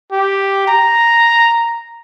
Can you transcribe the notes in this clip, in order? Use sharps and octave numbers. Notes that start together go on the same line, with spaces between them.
G4
A#5